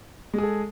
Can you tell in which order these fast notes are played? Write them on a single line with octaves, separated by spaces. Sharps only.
G#3 G#4 A4